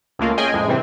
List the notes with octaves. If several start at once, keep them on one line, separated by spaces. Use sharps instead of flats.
C#2 A3 A#3 F4
C#4 G#4 D#5 G5 G#5
F2 A2 G#3
G2 C3 E3 C4